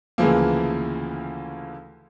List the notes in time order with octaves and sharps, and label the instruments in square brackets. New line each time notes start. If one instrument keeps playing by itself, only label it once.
[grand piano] D2 C#3 E3 F3 A#3